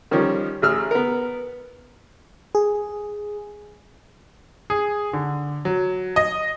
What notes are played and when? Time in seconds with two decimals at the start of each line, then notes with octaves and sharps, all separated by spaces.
0.11 D#3 F3 G3 C#4
0.62 A1 G#4 E6 F6
0.91 B3 A#4
2.55 G#4
4.70 G#4
5.13 D3
5.65 F#3
6.16 D#5